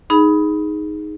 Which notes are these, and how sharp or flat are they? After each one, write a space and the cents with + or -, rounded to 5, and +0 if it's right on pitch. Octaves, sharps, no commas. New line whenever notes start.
D#4 +0 G#4 +0 B5 +0